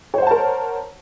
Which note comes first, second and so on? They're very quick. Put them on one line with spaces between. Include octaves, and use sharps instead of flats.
C#5 C5 F#5 A5 A#4